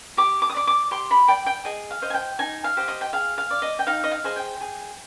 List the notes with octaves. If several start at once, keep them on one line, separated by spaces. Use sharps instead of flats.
G4 D6
D6
D#6
D5 D6
D6
G4 C6
B5
D5 G5
G5
G#4 D#5
F5
C5 D#5
G#5
G5
D#4 G#5
F5
G4 C5 D#5
D#5
G5
G#4 F5
F5
D5
D#5
G5
D#4 F5
D#5
F5
G#4 C5 D#5
G5
G#4